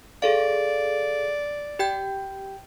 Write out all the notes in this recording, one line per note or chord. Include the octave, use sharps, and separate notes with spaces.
G#4 A4 D5 F5
G4 G5 G6